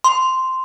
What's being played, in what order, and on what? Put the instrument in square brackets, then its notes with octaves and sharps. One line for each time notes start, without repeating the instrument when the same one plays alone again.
[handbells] C6